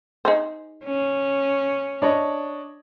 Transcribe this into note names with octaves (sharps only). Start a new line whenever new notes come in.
D#4 G#4 C5
C#4
D4 C#5 D#5